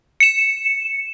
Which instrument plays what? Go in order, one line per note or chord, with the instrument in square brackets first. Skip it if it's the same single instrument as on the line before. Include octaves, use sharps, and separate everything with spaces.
[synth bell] C#7 E7